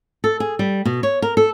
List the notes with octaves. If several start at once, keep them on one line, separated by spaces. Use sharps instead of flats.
A4
G#4
G3
B2
C#5
A#4
A4